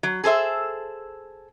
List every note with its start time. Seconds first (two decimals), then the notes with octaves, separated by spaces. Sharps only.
0.03 F#3
0.24 G#4 A4 C5 E5